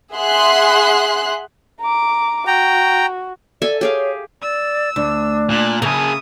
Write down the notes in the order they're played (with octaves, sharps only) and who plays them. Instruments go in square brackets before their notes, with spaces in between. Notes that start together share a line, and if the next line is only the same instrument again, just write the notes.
[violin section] G#4 E5 F#5 C6 F#6
[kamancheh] A#5 D6
[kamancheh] F#4 [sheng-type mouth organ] G5 A#5
[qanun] A4 E5 G#5 [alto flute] D5
[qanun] G4 G#4 F5 [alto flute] C#5
[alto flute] D5 [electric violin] E6
[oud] D2 [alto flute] D4
[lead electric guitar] A#2 [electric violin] A5 F#6
[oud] C#3 [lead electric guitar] A#3 G#4 [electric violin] E5 D#6